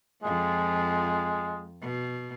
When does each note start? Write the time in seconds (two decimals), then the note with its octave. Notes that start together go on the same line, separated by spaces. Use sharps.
0.23 F2 F3 G#3
1.82 B2